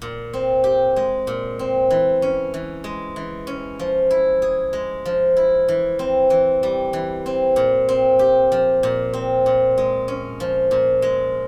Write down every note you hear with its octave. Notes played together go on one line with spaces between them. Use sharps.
A#2
C4
G4
G#3
A#2
C4
E3
C#4
E3
G#3
E3
C#4
F3
E4
G#4
G#3
F3
E4
E3
C4
E3
G3
E3
C4
A#2
C4
G4
F3
A#2
C4
A#2
G#3
C#4
F3
A#2
G#3